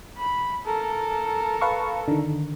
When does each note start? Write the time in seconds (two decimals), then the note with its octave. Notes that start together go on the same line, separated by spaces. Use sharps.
0.18 B5
0.65 A4 A#4
1.61 B4 F5 C#6
2.08 D3 D#3